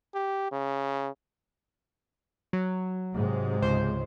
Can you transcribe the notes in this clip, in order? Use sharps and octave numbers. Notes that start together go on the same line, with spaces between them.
G4
C#3
F#3
G#2 C3 G#3
C#2 C5